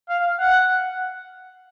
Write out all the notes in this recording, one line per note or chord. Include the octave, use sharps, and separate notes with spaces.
F5
F#5